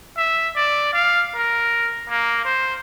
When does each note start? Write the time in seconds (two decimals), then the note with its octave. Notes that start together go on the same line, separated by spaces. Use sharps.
0.17 E5
0.56 D5
0.93 F5
1.35 A#4
2.10 A#3
2.45 C5